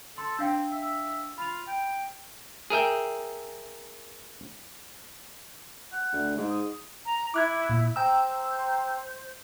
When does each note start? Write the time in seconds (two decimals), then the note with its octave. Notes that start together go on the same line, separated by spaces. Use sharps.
0.18 A4 C6
0.39 C4 D4 F5 G5
0.71 E5
1.38 F4 B5 F7
1.67 G5
2.70 G#4 A#4 E5 G5
5.92 F#5
6.13 D2
6.37 G#2
6.50 D#6
7.06 A#5
7.34 E4 D6 F#6 G#6
7.70 A#2
7.96 C5 G5 A#5 E6